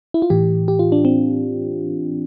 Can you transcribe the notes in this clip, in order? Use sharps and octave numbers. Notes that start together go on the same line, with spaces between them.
E4
F4
A2 E3 G4
G4
F4
D4
C4